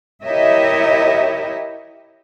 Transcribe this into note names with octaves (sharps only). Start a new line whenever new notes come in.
E4 G4 A#4 C#5 D#5 E5